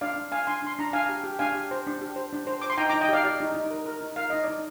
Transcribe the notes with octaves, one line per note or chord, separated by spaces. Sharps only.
D4 D5 F5
D4
D4 F5 G#5
D4 G#5 C6
D4 C6
D4 A#5
D4 F5 G#5
G4
G4
D4 F5 G#5
G4
C5
D4
G4
C5
D4
C5
C5 D6
C6
D#4 G5 A#5
D#4 A#5 D6
D#5 G5
G4 D5 F5
G4 D5
D#4
D#4
A#4
A#4
D#4
A#4 F5
D#4 D#5
D#4 D5